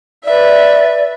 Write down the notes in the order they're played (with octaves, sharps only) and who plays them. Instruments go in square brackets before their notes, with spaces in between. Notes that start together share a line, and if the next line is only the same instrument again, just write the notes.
[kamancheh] B4 E5 [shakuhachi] D5